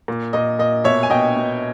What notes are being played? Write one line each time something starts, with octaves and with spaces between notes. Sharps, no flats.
A#2
A#2 D#5
A#2 D#5
B2 C#5 E5
G#5
B2 D#5 G5
B2